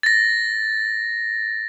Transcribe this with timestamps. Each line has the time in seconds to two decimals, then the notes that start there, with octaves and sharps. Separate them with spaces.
0.03 A6 A#6